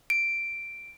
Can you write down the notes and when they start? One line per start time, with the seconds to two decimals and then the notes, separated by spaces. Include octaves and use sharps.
0.10 D7